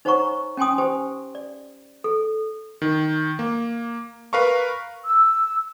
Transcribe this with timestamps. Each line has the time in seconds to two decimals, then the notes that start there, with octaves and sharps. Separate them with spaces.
0.05 D#4 C5 C#5 F#5 A#5 C#6
0.57 C#4 G5 G#5 C6 D#6
0.78 G4 C5 G#5
1.35 D5
2.04 A4
2.82 D#3
3.39 A#3
4.33 A#4 B4 F5 A#5 C#6
5.05 E6